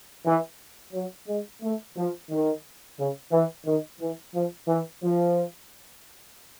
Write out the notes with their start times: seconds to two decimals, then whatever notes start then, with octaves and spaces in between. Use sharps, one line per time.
0.25 E3
0.93 F#3
1.27 G#3
1.61 A3
1.96 F3
2.30 D#3
2.98 C#3
3.32 E3
3.66 D#3
4.00 E3
4.34 F3
4.68 E3
5.02 F3